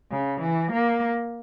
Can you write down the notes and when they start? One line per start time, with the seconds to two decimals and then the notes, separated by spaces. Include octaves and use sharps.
0.11 C#3
0.42 E3
0.72 A#3